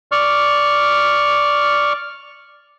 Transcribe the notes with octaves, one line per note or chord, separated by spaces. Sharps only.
D5 C#6 F6